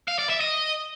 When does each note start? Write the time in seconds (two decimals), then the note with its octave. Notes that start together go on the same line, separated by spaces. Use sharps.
0.08 F5
0.19 D5
0.29 E5
0.40 D#5